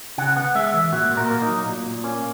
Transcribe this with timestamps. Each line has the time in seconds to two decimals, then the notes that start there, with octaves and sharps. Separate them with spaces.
0.18 C#3 F#5
0.36 B3 F#5
0.55 G#3 E5
0.74 E3 E5
0.92 A#2 F#4
1.11 A#2
1.17 A#4
1.30 A#3
1.42 D#4
1.48 F#3
1.66 A#2
1.85 A#2
2.04 A#3 C#4